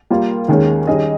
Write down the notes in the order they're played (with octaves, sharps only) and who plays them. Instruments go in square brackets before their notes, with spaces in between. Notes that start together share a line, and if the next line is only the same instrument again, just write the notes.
[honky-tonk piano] G3 A#3 F4 A#4
D#2 D#3 G#3 C#4
D#3 G3 C#4 G#4 D#5